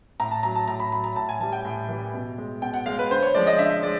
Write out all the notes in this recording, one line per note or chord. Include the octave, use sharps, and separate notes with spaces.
A2 A#5
A5
F#3 A#5
A5
A2 A#5
B5
F#3 B5
A#5
A2 A5
G#5
E3 G3 A5
G5
A2
E3 G3
B2
G#3
B2 G5
F#5
G#3 F5
B4
D3 C5
C#5
F3 G#3 D5
D#5
D3 E5
G#3 D5